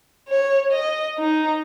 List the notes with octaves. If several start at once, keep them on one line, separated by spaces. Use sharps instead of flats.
C#5
D#5
D#4